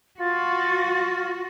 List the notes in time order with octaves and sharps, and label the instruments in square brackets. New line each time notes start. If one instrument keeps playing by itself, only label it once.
[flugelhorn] F4 [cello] F#4 [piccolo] A6